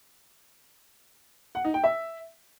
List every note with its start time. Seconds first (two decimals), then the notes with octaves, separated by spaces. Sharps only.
1.55 F#5
1.64 D#4
1.74 G5
1.84 E5